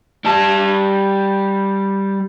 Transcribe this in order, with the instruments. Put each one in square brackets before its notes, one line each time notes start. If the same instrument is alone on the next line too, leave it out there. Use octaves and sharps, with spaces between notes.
[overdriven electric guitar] G3 A5